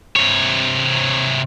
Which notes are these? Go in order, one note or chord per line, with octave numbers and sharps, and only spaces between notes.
C3 C#5